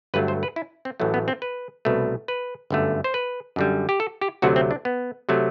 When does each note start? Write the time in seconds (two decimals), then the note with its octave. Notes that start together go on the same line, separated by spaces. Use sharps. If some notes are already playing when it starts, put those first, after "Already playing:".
0.14 G1 G2 F#3 A3 B4
0.28 C5
0.43 B4
0.56 E4
0.85 C4
1.00 A1 A2 F#3 A3
1.14 B3
1.28 C4
1.42 B4
1.85 C2 B2 A3
2.28 B4
2.70 G1 F#2 D3 A3
3.04 C5
3.14 B4
3.56 F#2 D3 G3
3.89 G4
4.00 A4
4.21 G4
4.42 D2 C3 F#3 A3 F#4
4.56 C4
4.71 D4
4.85 B3
5.29 C3 F#3 A3